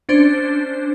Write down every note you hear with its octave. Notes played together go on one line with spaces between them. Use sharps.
C#4 D4 C5